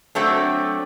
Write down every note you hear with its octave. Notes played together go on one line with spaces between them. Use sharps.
F#3 A3 C4 D4